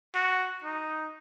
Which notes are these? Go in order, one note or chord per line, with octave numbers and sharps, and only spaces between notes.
F#4
D#4